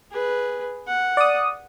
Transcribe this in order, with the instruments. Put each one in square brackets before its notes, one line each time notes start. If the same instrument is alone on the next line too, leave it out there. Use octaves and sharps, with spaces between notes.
[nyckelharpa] G#4 B4
F#5
[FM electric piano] D5 D#6